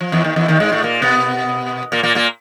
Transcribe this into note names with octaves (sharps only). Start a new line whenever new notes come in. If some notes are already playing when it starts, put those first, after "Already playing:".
F3
E2 E3
D#2 D#3
E2 E3
D#2 D#3
G#2 G#3
A2 A3
A#2 A#3
B2 B3
A#2 A#3
A#2 A#3
A#2 A#3